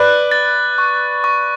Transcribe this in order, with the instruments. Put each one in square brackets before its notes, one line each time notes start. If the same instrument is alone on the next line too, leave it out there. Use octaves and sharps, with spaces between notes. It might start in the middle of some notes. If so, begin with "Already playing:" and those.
Already playing: [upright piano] B4 D5 [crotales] F#6
[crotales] A6
C#6
C#6